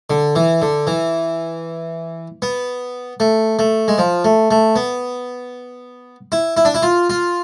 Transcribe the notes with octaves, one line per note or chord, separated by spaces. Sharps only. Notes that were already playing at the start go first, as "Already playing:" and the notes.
D3
E3
D3
E3
B3
A3
A3
G#3
F3
A3
A3
B3
E4
E4
D4
E4
F4
F4